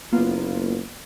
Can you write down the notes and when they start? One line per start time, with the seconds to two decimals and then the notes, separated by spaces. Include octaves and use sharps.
0.12 F#1 A#3 B3 F4